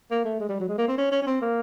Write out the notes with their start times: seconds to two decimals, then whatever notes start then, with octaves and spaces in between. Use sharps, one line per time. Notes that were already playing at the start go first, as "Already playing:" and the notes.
0.11 A#3
0.25 A3
0.40 G#3
0.49 G3
0.60 F#3
0.69 G#3
0.78 A#3
0.88 C4
0.98 C#4
1.12 C#4
1.22 C#4
1.27 C4
1.42 A#3